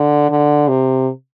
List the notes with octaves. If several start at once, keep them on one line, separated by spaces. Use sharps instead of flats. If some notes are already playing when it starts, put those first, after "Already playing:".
Already playing: D3
D3
C3